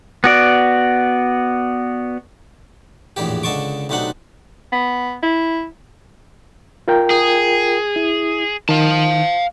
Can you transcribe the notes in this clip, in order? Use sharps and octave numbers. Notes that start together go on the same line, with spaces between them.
B3 F#4 D5
A#1 E2 A2 E3 G4
C#2 D3 D#5 A5 C#6 D6
B1 C3 A3 D4 D#4 F#5
B3
E4
F4 A#4 G5
G#4
E4
D#3 F5 A5